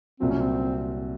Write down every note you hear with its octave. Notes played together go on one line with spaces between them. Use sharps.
C2 A#2 F#3 C4
C#4
C4